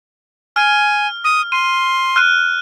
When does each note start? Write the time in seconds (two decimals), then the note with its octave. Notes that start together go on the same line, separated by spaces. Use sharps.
0.56 G#5 F6
1.24 D#6
1.52 C6 D#7
2.16 F6 F#6 D#7